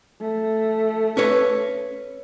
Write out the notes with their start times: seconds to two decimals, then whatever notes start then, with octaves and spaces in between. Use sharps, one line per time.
0.21 A3
1.17 C#4 B4 C#5